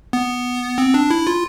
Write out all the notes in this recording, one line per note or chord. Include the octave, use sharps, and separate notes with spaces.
B3
C4
D4
E4
F4